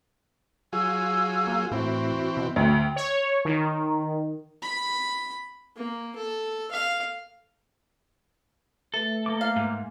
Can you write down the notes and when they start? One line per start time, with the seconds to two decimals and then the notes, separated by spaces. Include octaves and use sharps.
0.73 F#3 F4 G#4 E6
1.47 A#3
1.72 A2 E3 C4 F#4
2.37 B2
2.56 D2 A3 G5
2.96 C#5
3.45 D#3
4.62 B5
5.76 A#3
6.16 A4
6.72 F5
8.94 A3 A4 B4 E5
9.26 A#3 D6
9.41 F5
9.56 G#2